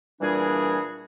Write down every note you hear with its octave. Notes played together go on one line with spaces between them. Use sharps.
A#2 E3 G3 D4 F#4 G#4